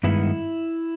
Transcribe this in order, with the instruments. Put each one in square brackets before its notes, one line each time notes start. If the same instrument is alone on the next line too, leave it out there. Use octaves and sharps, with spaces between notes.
[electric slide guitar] G2 D#3 G#3 B3 E4